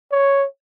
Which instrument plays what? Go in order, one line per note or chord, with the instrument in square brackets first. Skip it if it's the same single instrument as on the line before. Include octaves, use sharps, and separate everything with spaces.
[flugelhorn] C#5